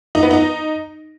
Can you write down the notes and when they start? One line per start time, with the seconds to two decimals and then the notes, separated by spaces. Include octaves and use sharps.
0.15 D#4
0.23 B3
0.31 D#4